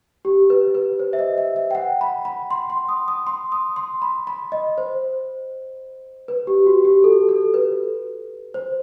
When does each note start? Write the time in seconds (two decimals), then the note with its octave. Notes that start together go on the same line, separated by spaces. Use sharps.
0.25 G4
0.50 B4
0.75 B4
0.99 C5
1.13 E5
1.19 D#5
1.38 E5
1.56 E5
1.71 G5
1.75 F#5
2.01 B5
2.25 B5
2.51 C6
2.70 C6
2.89 D#6
3.08 D#6
3.27 C6
3.52 D#6
3.76 C6
4.02 B5
4.27 B5
4.52 D#5
4.78 C5
6.28 B4
6.47 G4
6.67 F#4
6.85 G4
7.04 A4
7.29 A4
7.54 B4
8.54 C5